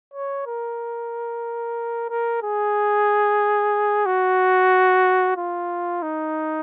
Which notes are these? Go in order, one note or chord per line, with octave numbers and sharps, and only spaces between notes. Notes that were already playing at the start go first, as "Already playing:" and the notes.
C#5
A#4
A#4
G#4
F#4
F4
D#4